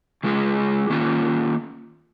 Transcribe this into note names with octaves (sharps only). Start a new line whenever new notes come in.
C#3 G#3 F4 G#4
D#3 A#3 C#4 F4